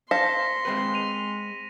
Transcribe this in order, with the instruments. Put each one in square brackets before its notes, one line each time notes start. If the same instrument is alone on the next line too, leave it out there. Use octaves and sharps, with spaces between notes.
[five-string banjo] C5 F5 A5 [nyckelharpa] C6 [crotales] A#6 B6 C#7
[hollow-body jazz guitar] G#3 C4 B4
[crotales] D#7 F7